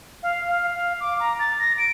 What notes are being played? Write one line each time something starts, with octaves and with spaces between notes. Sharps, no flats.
F5
F5
F5
D6
A#5
A6
A#6
D7